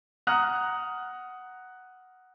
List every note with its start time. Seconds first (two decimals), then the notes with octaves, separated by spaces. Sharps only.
0.27 F#5 A#5 D#6 F6 F#6